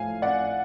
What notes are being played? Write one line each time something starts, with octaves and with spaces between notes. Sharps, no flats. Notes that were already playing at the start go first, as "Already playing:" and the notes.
Already playing: A2 F3 F5 G#5
D5 F#5